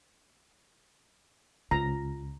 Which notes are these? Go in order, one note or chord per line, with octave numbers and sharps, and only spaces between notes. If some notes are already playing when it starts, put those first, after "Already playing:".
C#2 F4 A#5